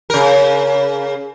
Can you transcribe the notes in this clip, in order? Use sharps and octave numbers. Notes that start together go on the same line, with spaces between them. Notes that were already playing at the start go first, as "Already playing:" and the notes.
C#3 A#4